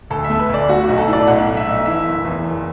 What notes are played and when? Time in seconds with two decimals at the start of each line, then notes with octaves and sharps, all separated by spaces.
0.10 D2 A4
0.24 E5
0.30 A3
0.39 B4
0.49 D2
0.54 D5
0.68 A3 F#4
0.84 B1 F#4
0.98 A4
1.08 A2
1.13 D5
1.27 B1 F#5
1.47 A3
1.57 E5
1.67 B1
1.86 E3 E5
2.06 F#1
2.25 E2
2.45 F#1